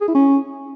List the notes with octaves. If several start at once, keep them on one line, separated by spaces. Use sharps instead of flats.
G#4
E4
C#4